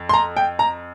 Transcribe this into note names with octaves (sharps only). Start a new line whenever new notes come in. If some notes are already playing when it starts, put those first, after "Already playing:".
Already playing: F2
C6
A#5
G5
A#5